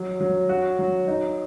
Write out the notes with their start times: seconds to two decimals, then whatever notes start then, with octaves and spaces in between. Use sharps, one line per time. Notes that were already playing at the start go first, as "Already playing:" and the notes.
Already playing: F#3
0.21 F#3
0.49 F#4
0.79 F#3
1.07 D#4